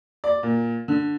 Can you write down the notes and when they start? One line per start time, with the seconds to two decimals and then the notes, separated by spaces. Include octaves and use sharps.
0.24 D5
0.43 A#2
0.88 D3